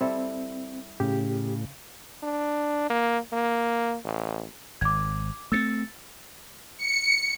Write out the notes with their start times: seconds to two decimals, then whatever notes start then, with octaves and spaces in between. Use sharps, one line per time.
0.01 G3 C4 E4 A4
1.00 A2 C#3 G4
2.23 D4
2.90 A#3
3.32 A#3
4.05 A1
4.81 G#1 D6 G#6
5.52 A3 A#3 C4 E6 A6 C#7
6.78 C#7